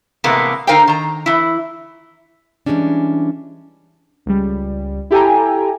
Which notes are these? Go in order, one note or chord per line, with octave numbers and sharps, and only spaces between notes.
A2 C3 E3 G#3 A#3 B3
D3 D#4 A#4 C5 F5 G5
D#3 A#5
E3 E4
E3 F3 G3 G#3 C#4 D4
C#2 G3
E4 G4 A4 G5 G#5 A#5